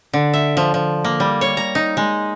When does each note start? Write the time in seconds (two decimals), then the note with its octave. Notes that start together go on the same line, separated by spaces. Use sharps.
0.13 D3
0.33 E5
0.57 F3
0.74 F3
1.04 A#3
1.20 G3
1.41 C#5
1.57 A#5
1.75 D#4
1.97 G#3